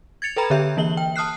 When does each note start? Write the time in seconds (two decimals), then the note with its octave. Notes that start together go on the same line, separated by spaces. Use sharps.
0.22 G#6 A6 C#7 F7
0.36 A4 B4 G5 A#5 B5
0.50 D3 G4 E5 G6
0.77 E3 A#3 F#7 G7
0.97 G5
1.16 A5 D#6 F6 F#6 C7